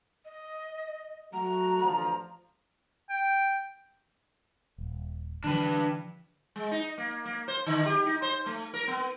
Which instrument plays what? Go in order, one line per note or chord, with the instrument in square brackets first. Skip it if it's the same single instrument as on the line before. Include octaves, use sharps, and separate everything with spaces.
[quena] D#5
[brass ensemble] F#3 A3 F#4 [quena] A#5
[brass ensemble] A1 D3 F3
[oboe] G5
[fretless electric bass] D#1
[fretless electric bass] D3 E3 F3 [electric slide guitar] D4 B4
[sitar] G#3
D#4
A#3
A#3
C5
D3
G4
D#4
C5
A3
A#4
B3